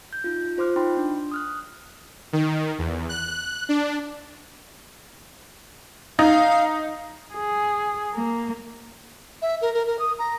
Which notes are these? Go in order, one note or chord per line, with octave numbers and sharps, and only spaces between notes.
G6
D#4 F4
F4 C5 C6 D6 F6 F#6
D#4 G5 B5 C6
D4
D#6 F6 F#6
D#3
E2
F#6
D4
D#4 F5
G#4
A#3
E5
A#4
A#4
A#4
D#6
A#5